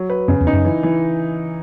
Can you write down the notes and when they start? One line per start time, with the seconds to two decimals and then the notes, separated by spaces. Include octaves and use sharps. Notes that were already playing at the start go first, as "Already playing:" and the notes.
Already playing: F#3
0.10 B4
0.28 F#2 C#3
0.41 E2
0.47 D#4
0.53 F#2
0.65 E3
0.83 E3